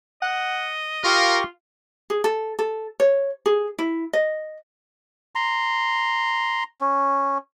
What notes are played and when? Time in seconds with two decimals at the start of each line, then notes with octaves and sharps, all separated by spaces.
0.22 D#5 F#5
1.04 F4 G4 A#4 F5 C#6
2.10 G#4
2.24 A4
2.59 A4
3.00 C#5
3.46 G#4
3.79 E4
4.13 D#5
5.35 A#5 C6
6.81 C#4